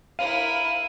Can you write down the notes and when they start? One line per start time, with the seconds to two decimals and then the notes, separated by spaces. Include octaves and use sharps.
0.19 E4 A#4 F5 D#7